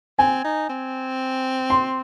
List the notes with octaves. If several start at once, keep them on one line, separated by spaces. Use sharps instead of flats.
C4 G#5
D#4
C4
C6